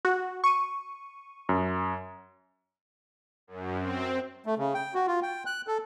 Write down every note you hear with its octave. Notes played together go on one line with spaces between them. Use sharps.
F#4
C#6 D#7
F#2
F#2
C4
A3
C#3
G5
F#4
F4
G5
F#6
A4